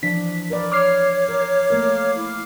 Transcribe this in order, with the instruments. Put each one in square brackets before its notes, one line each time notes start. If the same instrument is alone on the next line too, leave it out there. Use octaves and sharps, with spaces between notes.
[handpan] E3 F3 D4 [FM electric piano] B6
[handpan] A#4 B4 D5
[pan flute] C#5 [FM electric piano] D6 F6 C7
[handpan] A#4
A3 A#3 A#4
[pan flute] E4